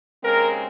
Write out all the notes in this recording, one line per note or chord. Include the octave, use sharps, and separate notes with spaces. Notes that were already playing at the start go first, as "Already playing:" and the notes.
D#2 C#3 G#3 C4 A#4